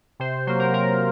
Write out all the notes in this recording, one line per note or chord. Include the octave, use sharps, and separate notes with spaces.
C3 C5
F#3 A#3 C5
A#4
C3 A#4